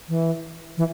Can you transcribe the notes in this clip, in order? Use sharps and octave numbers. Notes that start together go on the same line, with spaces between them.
E3
E3